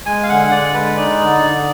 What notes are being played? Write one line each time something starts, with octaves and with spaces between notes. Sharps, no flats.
G#3 G#5
F5
D3 F#5
D3 D5
G#3 B4
D#4 D5
D3
D3